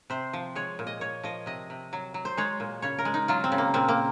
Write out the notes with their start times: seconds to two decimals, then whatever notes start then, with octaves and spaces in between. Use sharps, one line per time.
0.10 C3 C5
0.33 F3
0.55 G#3 C#5
0.79 A#2
0.87 D#5
1.01 A#2 C#5
1.23 F3 D#5
1.46 C3 D#5
1.70 C3
1.93 F#3
2.14 F#3
2.25 C5
2.37 G#3 C#5
2.60 A#2
2.82 C#3 C#5
2.98 A#4
3.05 G#3
3.14 D#4
3.28 F#3 F4
3.44 C4
3.52 C#3
3.58 A#3
3.74 A#2 C4
3.88 A#3